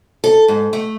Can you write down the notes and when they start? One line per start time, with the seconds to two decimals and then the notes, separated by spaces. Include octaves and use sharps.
0.24 A4
0.48 G#2
0.73 A3